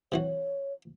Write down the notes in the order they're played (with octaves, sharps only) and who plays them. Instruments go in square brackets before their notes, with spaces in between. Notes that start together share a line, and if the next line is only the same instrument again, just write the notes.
[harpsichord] C3 E3 F#4 [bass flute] C#5